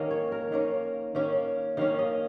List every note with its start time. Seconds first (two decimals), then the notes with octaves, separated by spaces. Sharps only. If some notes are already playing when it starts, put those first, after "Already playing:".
Already playing: D#3 A#3 C#4 A#4
0.11 C#5
0.32 A#4
0.52 D#3 A#3 C#4
1.15 D#3 A#3 C#4
1.77 D#3 A#3 C#4 F5
1.99 D#5